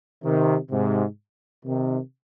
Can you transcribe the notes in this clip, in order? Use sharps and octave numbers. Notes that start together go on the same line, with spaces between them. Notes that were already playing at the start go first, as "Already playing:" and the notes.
C3 D#3
G#2 C3
C3 D#3